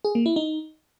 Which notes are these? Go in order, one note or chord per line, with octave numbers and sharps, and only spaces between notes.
G#4
A#3
E4
D#4